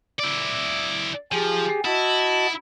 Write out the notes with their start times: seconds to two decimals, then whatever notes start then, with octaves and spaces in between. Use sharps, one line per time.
0.19 E4 D5
1.32 F3 G4 G#4
1.85 E4 F#4 D#5 A5